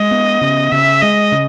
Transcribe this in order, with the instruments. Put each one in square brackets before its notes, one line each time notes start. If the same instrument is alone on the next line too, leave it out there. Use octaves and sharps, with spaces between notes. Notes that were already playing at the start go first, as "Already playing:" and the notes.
Already playing: [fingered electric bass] G#3 [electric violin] D#5
[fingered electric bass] B3
C#3
[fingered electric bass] C#3 [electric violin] E5
[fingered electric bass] G#3 [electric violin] D#5
[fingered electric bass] C#3